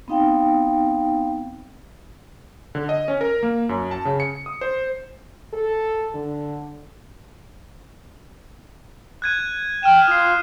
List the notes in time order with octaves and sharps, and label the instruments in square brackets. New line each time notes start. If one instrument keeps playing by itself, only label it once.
[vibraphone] B3 C4 D#4 F5 G5
[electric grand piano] D3
D#5
C#4
A#4
A#3
F#2
A5
C#3
C#7
D#6
C5
[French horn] A4
D3
[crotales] F#6 G#6 D#7
[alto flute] G5 [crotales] F6 D#7 E7
[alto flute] F4 [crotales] D#6 C7